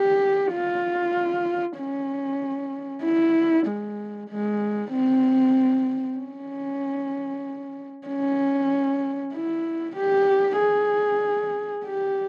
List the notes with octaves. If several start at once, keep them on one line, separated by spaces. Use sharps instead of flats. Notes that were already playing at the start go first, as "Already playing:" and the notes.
Already playing: G4
F4
C#4
E4
G#3
G#3
C4
C#4
C#4
E4
G4
G#4
G4